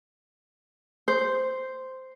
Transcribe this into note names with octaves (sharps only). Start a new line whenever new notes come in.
C5